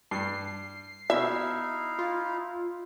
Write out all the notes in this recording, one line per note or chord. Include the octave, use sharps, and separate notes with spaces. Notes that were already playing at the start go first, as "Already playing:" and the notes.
G2 C7
B2 D#4 E4 E5 F5
F4